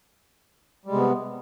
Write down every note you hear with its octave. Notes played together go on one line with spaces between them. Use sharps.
C3 G3 G#3 B3